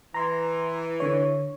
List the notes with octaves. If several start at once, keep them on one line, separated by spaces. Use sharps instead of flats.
E3 A#5 C6
D3 C#5